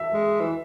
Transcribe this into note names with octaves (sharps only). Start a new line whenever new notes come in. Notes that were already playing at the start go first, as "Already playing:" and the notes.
Already playing: E5
G#3
E3